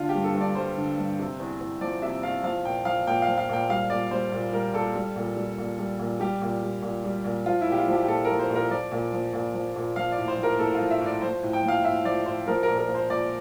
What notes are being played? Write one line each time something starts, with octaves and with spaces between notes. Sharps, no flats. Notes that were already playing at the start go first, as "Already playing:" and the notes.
Already playing: D3 F4
G4
G2
A4
G2
D5
G3 C5
D3
G2
C3
E2
E2
F3 D5
C3 E5
E2 F5
F3 F5
A#2 G5
F3 F5
A#2 G5
F5
F3
F5
A#2 G5
G3 F5
A#2 D5
G3 C5
A#2
G3 A#4
A#2 A4
G3
A#2
G3
A#2
G3
A#2
G3 G4
A#2
G3
A#2
G3
A#2
F3 F4
E4
A#2
G4
F4
F3 G4
G4
A#2 A4
A#4
F3
C5
A#2
A#4
F3 D5
A#2
F3
A#2
F3
A#2
F3 F5
D5
A2
C5
F3
A#4
A2 A4
F4
F3
E5
A2
D5
F3 C5
A2
G5
F3
F5
A2 E5
F3 D5
A2 C5
F3 A#4
A#2 A#4
A#4
F3
C5
A#2 D5